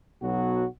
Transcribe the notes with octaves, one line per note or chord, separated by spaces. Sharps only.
B1 B2 F#3 B3 F#4